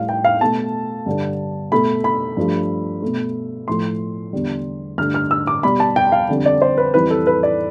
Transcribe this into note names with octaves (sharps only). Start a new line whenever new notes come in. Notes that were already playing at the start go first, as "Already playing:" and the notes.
Already playing: A2 G3 F5
G5
F5
B2 A3 A5
G2 D3 G3
B2 A3 B5
B5
G2 F3 A3
B2 A3
A2 F3 A3 C6
E2 D3 G3
G2 D3 A3 F6
F6
E6
D6
B2 G3 B5
A5
G5
F5
F2 D3 G3
D5
C5
B4
F2 E3 G3 B4
A4
B4
D5